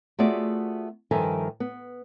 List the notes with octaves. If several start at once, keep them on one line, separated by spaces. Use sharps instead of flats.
A3 B3 F4 F#4 G#4 D5
G2 D#3 F3 A4 E5 G#5
B3